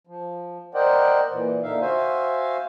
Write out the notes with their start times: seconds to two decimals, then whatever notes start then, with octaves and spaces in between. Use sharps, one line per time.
0.07 F3
0.74 A#4 C5 D5 D#5 F#5 G5
1.31 A#2 E3
1.63 A#2 D3 D#4 E5 F5
1.81 F#4 C5 E5 F5 G#5